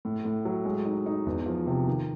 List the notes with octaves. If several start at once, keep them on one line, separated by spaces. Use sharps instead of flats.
A2
A2
F#3
G#3
D#4
D#4
E2
F3
C3
D#3